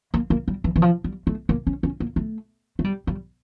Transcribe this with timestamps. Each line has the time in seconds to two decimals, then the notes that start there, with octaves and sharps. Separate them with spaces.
0.14 A#3
0.30 A#3
0.48 G3
0.64 E3
0.76 E3
0.82 F3
1.04 G3
1.27 A3
1.49 A#3
1.67 C#4
1.83 C#4
2.00 A#3
2.16 A3
2.79 A3
2.84 G3
3.07 G3